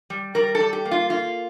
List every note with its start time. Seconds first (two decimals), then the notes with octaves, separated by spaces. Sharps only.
0.10 G3
0.35 G3 A#4
0.55 A4
0.60 G3
0.73 G4
0.85 A#3
0.91 F4
1.10 A#3 F4